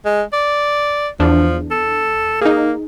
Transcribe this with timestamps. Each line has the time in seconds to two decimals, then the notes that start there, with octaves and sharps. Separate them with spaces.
0.05 G#3
0.33 D5
1.20 E2 F3 D4
1.71 A4
2.41 A#3 D#4 G#4